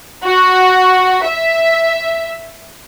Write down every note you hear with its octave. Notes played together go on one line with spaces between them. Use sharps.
F#4
E5